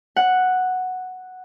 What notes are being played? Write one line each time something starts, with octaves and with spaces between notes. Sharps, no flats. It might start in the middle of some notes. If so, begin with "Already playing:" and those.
F#5